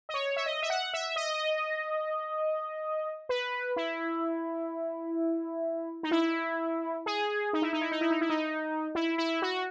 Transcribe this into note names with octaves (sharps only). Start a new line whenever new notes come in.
D#5
C#5
E5
D#5
E5
F#5
E5
D#5
B4
E4
D#4
E4
G#4
D#4
E4
D#4
E4
D#4
E4
D#4
E4
D#4
E4
E4
F#4